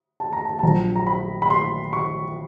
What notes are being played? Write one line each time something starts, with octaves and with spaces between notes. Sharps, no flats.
A5
A#5
A5
A5
A#1 A#2 F#3 A#5
A#5
B5
B5
C6
C#6